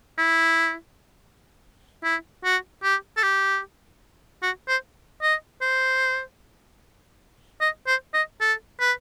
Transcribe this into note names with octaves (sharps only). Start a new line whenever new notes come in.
E4
E4
F#4
G4
A4
G4
F#4
C5
D#5
C5
D#5
C5
D#5
A4
B4